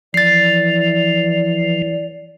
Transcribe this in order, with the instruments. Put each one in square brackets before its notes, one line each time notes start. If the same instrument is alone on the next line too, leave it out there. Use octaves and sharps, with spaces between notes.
[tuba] E3 [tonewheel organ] F3 [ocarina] D5 [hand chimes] A6 C7